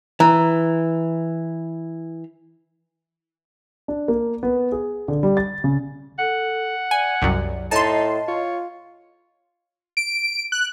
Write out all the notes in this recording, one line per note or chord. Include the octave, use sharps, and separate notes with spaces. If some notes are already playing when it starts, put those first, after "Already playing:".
E3 A#5
D4
A#3
B3
G#4
D3
G3
A6
C#3
A4 F#5
D5 G#5
C2 F#2 D5
A2 D#4 D#5 A5 C6
F4 C#5
D7
F#6